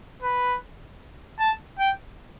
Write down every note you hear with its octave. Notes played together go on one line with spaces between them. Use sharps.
B4
A5
G5